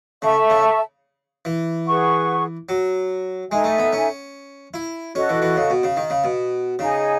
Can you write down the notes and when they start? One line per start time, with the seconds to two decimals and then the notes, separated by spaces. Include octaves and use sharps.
0.22 C#3 A4 E5 A5 C#6
0.50 C#3
1.45 E3
1.86 G#4 B4 F#5 C#6
2.69 F#3
3.51 G#3 D#4 A4 E5 G#5
3.64 A3
3.78 B3
3.93 C#4
4.74 E4
5.15 C#4 F#4 A4 D#5
5.29 E3
5.42 E3
5.56 C#3
5.70 B2
5.83 C#3
5.97 D#3
6.10 C#3
6.24 B2
6.79 C#3 D#4 G#4 D#5 G#5